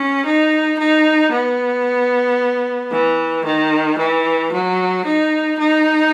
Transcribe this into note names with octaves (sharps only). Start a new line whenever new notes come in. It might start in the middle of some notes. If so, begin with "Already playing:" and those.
Already playing: C#4
D#4
D#4
B3
E3
D#3
E3
F#3
D#4
D#4